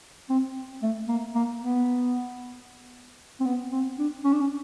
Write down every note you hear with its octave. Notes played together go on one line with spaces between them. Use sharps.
C4
A3
A#3
A#3
B3
C4
B3
C4
D4
C#4
D4
C#4